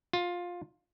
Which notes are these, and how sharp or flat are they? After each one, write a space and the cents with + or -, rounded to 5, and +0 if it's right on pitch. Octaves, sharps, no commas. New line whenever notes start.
F4 +15